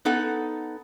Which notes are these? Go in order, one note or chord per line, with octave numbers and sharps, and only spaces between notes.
B3 D#4 A4 F#5